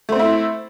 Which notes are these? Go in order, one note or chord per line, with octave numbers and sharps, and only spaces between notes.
A3 C4 E4 C5